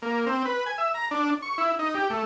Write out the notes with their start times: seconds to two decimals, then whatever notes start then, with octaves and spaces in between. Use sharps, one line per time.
0.02 A#3
0.26 C4
0.45 B4
0.66 G#5
0.78 E5
0.94 A#5
1.11 D4
1.42 C#6
1.58 E4
1.79 D#4
1.95 G4
2.10 A3